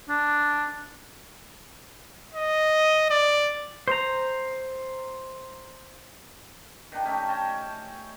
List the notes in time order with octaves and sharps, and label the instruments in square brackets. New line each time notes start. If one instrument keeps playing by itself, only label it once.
[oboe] D4
[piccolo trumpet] D#5
D5
[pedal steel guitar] C5 A#5
[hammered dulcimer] D#3 D4
A3 C#4 D#4 G4
C#5 D#5 G5 A5